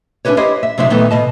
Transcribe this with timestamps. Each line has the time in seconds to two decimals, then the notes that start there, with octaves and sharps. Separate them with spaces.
0.25 C#4 D4 E4 G4 B4 C#5
0.37 E4 G4 C5 C#5 D#5
0.63 E5
0.78 C3 F#3 G#3 C4 D#4 E5
0.90 A#2 D#3 E3 A3 B3
1.11 B2 D#5 A5